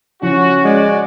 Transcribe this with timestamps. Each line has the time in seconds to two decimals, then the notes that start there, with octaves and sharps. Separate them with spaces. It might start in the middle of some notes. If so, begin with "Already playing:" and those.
0.22 C#3 F3 C#4 E4 F#4
0.65 G#3 F#4 D5